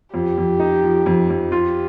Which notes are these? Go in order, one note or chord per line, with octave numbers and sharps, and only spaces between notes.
F2 G4
F2
D#4
F3
F2
F2
F4 G4